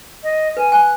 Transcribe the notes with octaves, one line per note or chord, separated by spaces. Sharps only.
D#5
B4 G#5
G#5 F#6